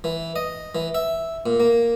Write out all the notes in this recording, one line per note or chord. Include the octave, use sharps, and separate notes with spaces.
E3
D#5
E3
E5
A#2
A#3